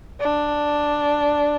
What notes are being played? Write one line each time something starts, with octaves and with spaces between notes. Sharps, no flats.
D4